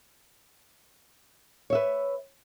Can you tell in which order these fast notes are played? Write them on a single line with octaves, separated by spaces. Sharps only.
C#5 E5 B4